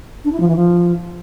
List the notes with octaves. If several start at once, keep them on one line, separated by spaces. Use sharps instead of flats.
D4
E4
F3
E3
F3